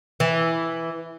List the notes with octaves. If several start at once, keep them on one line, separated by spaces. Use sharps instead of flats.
E3